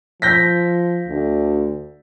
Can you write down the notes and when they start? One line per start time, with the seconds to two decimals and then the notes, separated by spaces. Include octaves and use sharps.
0.22 F3 G6 A#6 B6
1.08 D2